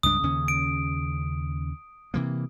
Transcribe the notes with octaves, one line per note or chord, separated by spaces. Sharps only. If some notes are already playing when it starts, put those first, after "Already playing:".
C#2 G2 D4 D#6
D#2 C#3 C#4
D7
C3 E3 A#3